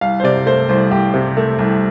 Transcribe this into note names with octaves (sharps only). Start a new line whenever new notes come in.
C2 F5
C5
C3 D5
A3 C5
C2 C5
C2 G4
C3
A3
C2